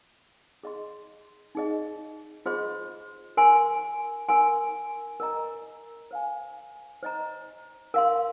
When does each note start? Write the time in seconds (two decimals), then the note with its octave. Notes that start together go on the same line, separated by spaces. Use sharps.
0.63 G#4 D#5 C6
1.55 D#4 G#4 D#5
2.46 F4 G#4 C5 D#5 C6
3.37 A#4 G#5 C6
4.29 A#4 G#5 C6
5.20 A#4 D#5 A#5
6.11 C5 F5 G#5
7.03 C5 D#5 A#5
7.94 A#4 F5 C6